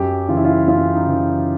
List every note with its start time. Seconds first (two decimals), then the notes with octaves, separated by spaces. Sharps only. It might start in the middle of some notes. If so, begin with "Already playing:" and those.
Already playing: F#2 G4
0.29 C#3 E3 F4
0.37 E4
0.45 F4
0.67 F#2 F4
0.94 D#4
1.07 C#3 E3